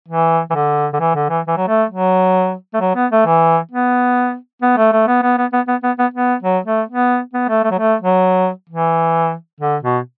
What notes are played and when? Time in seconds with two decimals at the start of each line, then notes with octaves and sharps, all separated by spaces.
0.09 E3
0.50 E3
0.55 D3
0.93 D3
1.00 E3
1.15 D3
1.30 E3
1.47 E3
1.57 F#3
1.68 A3
1.90 F#3
2.74 A3
2.81 F#3
2.96 B3
3.12 A3
3.26 E3
3.72 B3
4.62 B3
4.77 A3
4.92 A3
5.08 B3
5.22 B3
5.38 B3
5.53 B3
5.68 B3
5.83 B3
5.99 B3
6.14 B3
6.43 F#3
6.66 A3
6.88 B3
7.34 B3
7.49 A3
7.64 A3
7.71 F#3
7.79 A3
8.02 F#3
8.69 E3
9.61 D3
9.83 B2